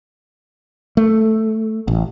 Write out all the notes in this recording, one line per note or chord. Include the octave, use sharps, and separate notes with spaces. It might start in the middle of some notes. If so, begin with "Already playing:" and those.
A3
A1